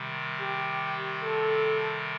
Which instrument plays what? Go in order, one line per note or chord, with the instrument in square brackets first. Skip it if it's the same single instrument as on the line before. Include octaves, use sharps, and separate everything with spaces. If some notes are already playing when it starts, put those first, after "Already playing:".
Already playing: [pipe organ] C3 D#3 G3
[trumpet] G4
A4